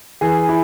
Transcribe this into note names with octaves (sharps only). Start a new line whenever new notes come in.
E3 G#4
E4